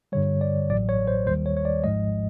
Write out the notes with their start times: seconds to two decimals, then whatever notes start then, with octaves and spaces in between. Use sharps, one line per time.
0.12 G2 D3 G3 C#5
0.41 D5
0.70 A1 A2 F#3 D5
0.89 C#5
1.07 C5
1.26 D#2 D#3 G3 C5
1.46 C#5
1.57 C#5
1.65 D5
1.84 G#1 G#2 F3 G#3 D#5